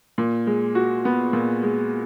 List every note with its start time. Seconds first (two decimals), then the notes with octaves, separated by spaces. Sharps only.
0.18 A#2
0.47 G#3
0.75 F#4
1.05 B3
1.33 A#2
1.63 G#3